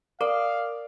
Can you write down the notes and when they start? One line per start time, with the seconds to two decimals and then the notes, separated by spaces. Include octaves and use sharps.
0.21 A#4 D5 F5